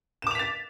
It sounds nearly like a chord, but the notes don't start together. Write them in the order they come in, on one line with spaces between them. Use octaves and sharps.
E7 D6 F7 B6 A6